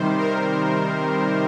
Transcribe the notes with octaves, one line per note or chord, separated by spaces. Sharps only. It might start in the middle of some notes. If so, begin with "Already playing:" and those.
Already playing: C3 D#3 G3 C5
A#4